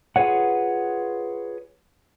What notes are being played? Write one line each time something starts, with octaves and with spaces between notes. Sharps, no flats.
F4 G#4 B4 C#5 F#5